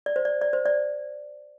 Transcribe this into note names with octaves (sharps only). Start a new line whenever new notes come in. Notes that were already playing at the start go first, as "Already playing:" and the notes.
D5
C5
D5
D5
C5
D5